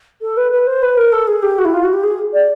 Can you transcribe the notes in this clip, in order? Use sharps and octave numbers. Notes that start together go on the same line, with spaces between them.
A4
B4
B4
C5
B4
A#4
A4
G#4
G4
F#4
E4
F4
F#4
G4
G#4
D5